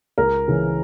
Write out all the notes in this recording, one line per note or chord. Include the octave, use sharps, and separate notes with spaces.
C#2 A#4
C#3 E3